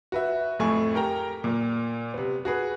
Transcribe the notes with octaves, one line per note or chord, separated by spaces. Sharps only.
F#4 B4 E5
F2 A2 A3 G#5 C#6
G4 A#4 G5 A#5
A#2 A#3
C3 B3
F#4 G#4 B4